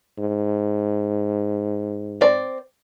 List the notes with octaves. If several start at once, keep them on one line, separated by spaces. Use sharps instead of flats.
G#2
C4 D5